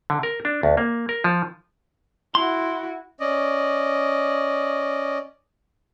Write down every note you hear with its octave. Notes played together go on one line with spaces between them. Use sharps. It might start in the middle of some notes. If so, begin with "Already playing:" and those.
D3
A#4
D4
D2
A#3
A#4
F3
E4 F#4 C6
C#4 D5 D#5